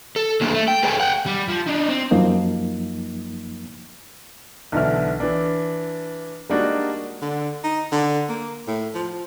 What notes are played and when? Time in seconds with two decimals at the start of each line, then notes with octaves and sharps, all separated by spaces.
0.16 A4
0.41 F#3 A#3 D4 G#4 A4
0.54 A3
0.68 G5
0.83 G#4 A4 B4 C#5 G5 G#5
1.00 F#5 G5
1.26 G3
1.48 F3
1.66 D4 D#4
1.89 C4
2.11 F#2 F3 A#3 D#4
4.72 B1 D3 E3 E4 F6
5.20 E3 D4
6.49 G3 G#3 A#3 D4 D#4 F#4
7.22 D3
7.64 D#4
7.92 D3
8.29 A#3
8.67 A2
8.95 F3